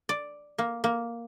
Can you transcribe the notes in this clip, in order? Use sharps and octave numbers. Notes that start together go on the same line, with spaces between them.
D5
A#3
A#3